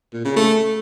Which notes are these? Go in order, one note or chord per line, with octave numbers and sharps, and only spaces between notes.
A#2
C#3
A3